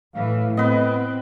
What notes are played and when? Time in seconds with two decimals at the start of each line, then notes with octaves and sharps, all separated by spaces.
0.15 A2 E3 F5
0.57 B3 C4 B4 D#5